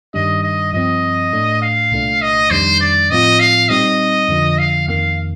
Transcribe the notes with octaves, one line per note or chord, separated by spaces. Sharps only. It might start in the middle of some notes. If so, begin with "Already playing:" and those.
G2 D#3 G3 D4 D#5
D#5
G2 F3 C4 D#5
A2 A3 D4
F5
C2 A#2 A3 D4
D#5
F2 D#3 G3 D4 C5
D5
A2 F3 C4 F4 D#5
F5
A#2 G3 C4 D#4 D#5
F2 D3 F3
F5
F2 D#3 A#3 F5